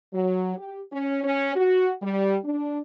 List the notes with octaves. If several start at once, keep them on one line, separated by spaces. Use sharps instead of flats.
F#3
G4
C#4
C#4
F#4
G3
D4